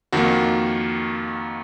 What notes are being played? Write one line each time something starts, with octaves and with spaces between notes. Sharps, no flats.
F2 D#3 A#3 F#4